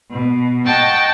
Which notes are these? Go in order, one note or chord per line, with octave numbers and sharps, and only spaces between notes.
B2
D#5 F#5 G5 A5 C#6